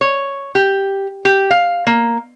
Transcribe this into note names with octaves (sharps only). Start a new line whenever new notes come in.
C#5
G4
G4
F5
A#3